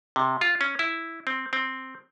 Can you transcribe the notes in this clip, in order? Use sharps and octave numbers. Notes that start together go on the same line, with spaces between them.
C3
F4
C#4
E4
C4
C4